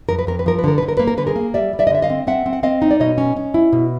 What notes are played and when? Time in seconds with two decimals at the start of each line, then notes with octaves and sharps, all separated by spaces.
0.09 F2 A#4
0.19 B4
0.27 F2 A#4
0.39 B4
0.46 F3 A#4
0.59 B4
0.64 D3 A#4
0.78 D3 B4
0.88 A#4
0.97 A#3 B4
1.07 A#4
1.17 D3 B4
1.27 G#4 A#4
1.36 A#3
1.54 G3 D5 E5
1.73 G3
1.79 D5 E5
1.87 D#5
1.90 D3 E5
2.02 D#5 F5
2.10 C4
2.27 C4 E5 F#5
2.46 C4
2.53 F#5
2.63 C4 D#5 F5
2.82 D#4
2.91 D5
3.00 B2 C#5 D#5
3.18 C#4
3.37 C#4
3.54 E4
3.73 B2